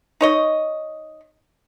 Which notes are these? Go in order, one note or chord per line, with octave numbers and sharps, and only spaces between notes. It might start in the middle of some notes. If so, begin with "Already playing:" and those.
D#4 C#5 D#5